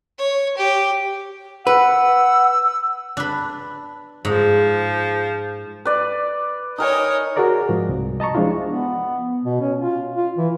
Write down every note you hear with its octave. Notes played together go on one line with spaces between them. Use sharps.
C#5
G4
B4 F#5 E6
D4 B4
G#2 F3
B4 D5
D#4 A#4 C#5 D#5 G#5
F#4 G#4 A#4 D5 A#5
G#2 F3
C2
D#5 A5 A#5 C#6
F3 G#3 D4 E4 F4
B3
B2
C#4
F4
F4
E3